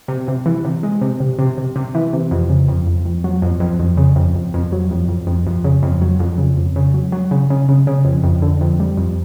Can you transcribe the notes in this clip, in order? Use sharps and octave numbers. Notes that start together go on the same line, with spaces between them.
C3
C3
E3
C3
G#3
C3
C3
C3
C3
C3
E3
C3
F2
C#3
F2
F2
F2
F#3
F2
F2
F2
C#3
F2
F2
F2
F#3
F2
F2
F2
F2
C#3
F2
F#3
F2
C#3
F2
C#3
F#3
F#3
C#3
C#3
C#3
C#3
F2
F2
D3
F2
G3
F2